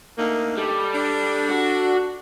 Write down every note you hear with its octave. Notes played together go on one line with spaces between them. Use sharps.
D2 A3 A#3 D#4
G3 A4
D4
F#4